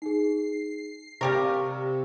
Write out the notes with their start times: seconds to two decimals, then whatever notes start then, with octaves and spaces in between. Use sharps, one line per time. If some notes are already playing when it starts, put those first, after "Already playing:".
0.02 D#4 G#4 C7
1.21 C3 G3 G4 A#4 D5 F5 C#6 A#6